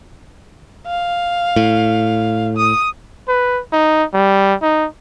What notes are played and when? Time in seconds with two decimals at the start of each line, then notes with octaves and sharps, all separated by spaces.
0.87 F5
1.56 A2
2.57 D#6
3.28 B4
3.72 D#4
4.14 G3
4.62 D#4